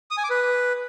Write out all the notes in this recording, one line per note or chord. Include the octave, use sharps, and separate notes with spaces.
D#6
G#5
D6
B4